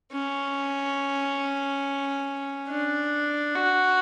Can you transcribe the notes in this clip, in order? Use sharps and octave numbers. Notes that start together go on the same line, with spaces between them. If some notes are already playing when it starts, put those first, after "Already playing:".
C#4
D4
F#4